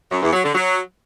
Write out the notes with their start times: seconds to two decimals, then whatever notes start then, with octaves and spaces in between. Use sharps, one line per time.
0.11 F#2
0.22 E2
0.33 F#3
0.44 D3
0.55 F#3